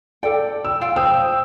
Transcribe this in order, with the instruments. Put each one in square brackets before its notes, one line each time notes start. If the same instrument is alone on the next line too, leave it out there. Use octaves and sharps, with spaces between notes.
[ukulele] A4 G5 [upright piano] D5
[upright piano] E6
[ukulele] F4 F5 G5
[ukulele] C5 [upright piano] G5 D#6 E6